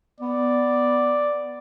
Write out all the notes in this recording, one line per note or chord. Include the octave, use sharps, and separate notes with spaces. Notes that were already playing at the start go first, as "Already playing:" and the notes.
B3 D5